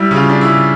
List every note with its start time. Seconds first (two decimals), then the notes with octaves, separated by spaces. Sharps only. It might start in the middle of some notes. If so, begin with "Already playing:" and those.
Already playing: G3 E4
0.11 C#3
0.16 F4
0.30 D4
0.41 E4
0.48 C#3